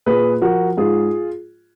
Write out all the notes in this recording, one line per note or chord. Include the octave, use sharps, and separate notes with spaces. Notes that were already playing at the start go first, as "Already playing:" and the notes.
A#2 G#4 B4
F3 F#4 A#4
G#2 F4 G#4